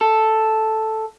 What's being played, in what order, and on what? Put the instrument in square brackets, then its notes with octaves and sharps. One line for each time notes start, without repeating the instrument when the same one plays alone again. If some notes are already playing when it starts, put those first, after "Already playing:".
[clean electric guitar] A4